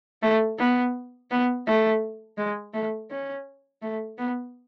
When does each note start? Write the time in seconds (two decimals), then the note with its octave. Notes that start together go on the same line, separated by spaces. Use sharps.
0.22 A3
0.58 B3
1.31 B3
1.67 A3
2.38 G#3
2.74 A3
3.10 C#4
3.82 A3
4.18 B3